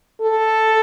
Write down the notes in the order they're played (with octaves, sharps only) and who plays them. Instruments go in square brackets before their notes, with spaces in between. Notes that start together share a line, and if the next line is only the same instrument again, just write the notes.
[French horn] A4